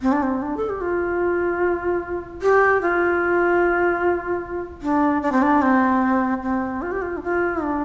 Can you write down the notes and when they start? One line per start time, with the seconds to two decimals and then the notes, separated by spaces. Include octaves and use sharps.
0.02 C4
0.12 D4
0.23 C4
0.42 D4
0.57 A4
0.70 G4
0.81 F4
2.42 G4
2.82 F4
4.82 D4
5.22 D4
5.32 C4
5.42 D4
5.62 C4
6.43 C4
6.82 F4
6.92 G4
7.02 F4
7.17 D4
7.23 F4
7.63 D4